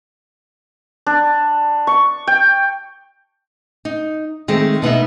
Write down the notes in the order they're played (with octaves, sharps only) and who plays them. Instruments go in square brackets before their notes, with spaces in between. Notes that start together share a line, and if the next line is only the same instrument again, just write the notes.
[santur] D4
C#6
G5
[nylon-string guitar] D#4
D#3 G#3 A3 C4
B2 B3 D#4 E5